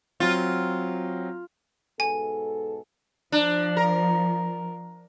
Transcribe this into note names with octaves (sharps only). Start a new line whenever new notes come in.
F#3 C4 F4
G#2 B2 A4 G#5
F3 D4
A#4